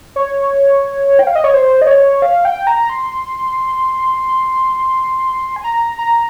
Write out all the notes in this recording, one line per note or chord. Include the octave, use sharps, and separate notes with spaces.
C#5
G5
F5
D#5
C#5
C5
D#5
C#5
F5
G5
A#5
C6
G#5
A#5
A#5